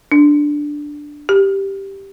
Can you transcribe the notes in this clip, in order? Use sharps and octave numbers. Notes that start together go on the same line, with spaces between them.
D4
G4